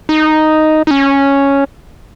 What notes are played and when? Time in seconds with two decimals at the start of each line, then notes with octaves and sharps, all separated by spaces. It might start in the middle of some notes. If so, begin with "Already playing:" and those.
0.09 D#4
0.87 D#4
0.91 C#4